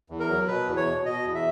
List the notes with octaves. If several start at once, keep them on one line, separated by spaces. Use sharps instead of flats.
E2
A#4
F#3
B2 B4
E2
C#5
B2
B2 D#5
E2
E5